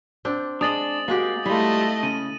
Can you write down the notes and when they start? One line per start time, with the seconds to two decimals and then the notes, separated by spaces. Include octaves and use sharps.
0.25 C4 D4
0.61 G#3 D4 D#5 D#6 A6 F#7
1.08 G#3 A#3 F#4 G4
1.46 G3 A3 E4 F4 D#5
2.03 C#3 D#7